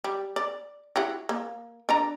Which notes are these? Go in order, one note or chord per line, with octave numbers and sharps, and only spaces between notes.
G3
D5
E4 F#4 G4
A#3
D4 D5 A#5